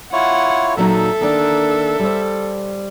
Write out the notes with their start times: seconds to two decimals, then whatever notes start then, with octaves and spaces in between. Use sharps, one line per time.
0.13 E4 F4 C#5 F#5
0.77 A#2 F#3 D#4 A4 E5
1.21 D#3 A#3 D4
1.99 G3 C5